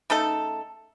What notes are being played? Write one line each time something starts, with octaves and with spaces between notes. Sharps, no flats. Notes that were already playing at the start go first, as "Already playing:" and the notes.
C#3 A3 D#4 A4